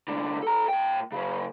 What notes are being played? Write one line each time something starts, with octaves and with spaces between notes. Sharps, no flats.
C2 D3
A4 A#5
A#2 G5
C#3 F#3